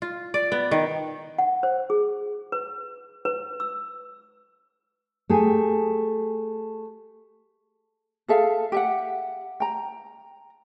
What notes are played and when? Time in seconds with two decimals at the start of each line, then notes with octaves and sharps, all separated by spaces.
0.02 F4
0.34 D5
0.52 B3
0.71 D#3
1.39 F#5
1.63 C5
1.90 G#4
2.52 B4
3.25 B4
3.60 E6
5.29 A3 G4 G#4
8.28 G#4 A4 E5 F5
8.72 G4 E5 F#5
9.60 G5 A#5